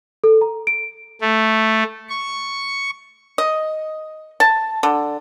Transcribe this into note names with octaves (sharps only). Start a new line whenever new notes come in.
A4
A#5
D7
A3
C#6
D#5
A5
D3